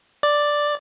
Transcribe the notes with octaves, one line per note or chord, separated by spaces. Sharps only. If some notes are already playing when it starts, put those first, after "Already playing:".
D5